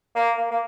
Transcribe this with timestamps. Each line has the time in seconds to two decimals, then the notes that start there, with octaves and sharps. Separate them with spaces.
0.15 A#3
0.37 A#3
0.51 A#3